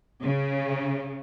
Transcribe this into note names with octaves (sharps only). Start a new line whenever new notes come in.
C#3